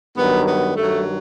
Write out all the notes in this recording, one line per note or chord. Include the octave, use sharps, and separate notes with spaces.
G2 D#3 F#3 B3
B3
G2 D#3 F#3 A3